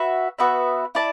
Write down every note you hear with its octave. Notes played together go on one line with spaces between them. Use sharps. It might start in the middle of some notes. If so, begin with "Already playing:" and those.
Already playing: F#4 B4 E5
B3 F#4 B4 E5
E4 D5 A5